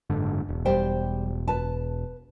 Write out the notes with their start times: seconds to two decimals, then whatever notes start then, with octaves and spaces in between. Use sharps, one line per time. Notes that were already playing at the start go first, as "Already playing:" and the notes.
0.10 F#1 G#2 D3
0.49 E1
0.65 G3 C5 G5
1.48 B4 A5